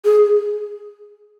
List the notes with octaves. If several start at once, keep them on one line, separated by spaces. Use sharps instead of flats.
G#4